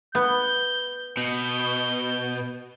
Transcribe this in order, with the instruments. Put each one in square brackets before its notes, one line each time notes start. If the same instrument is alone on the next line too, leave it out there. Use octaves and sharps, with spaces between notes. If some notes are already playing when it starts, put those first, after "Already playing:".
[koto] B3 [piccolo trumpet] G6
[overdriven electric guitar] B2 [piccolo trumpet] G6